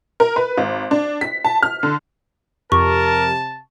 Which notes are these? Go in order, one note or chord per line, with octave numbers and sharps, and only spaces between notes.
A#4
B4
G#1
D4
B6
A5
F6
D3
F2 C3 G4 A#4 A5 C#6